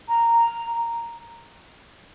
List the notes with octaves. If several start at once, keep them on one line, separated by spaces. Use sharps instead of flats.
A#5